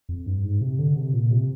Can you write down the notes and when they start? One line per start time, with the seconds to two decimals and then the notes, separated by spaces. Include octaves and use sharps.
0.09 F2
0.26 G2
0.44 G#2
0.61 C3
0.79 D3
0.96 C3
1.13 A#2
1.31 C3